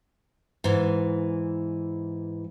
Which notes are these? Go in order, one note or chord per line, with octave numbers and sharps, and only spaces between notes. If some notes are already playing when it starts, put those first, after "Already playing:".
G#2 E3